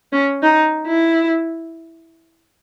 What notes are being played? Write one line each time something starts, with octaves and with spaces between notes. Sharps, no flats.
C#4
D#4
E4